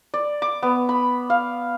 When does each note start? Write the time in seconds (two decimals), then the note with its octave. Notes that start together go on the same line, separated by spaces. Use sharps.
0.14 D5
0.42 D6
0.63 B3
0.89 B5
1.30 F5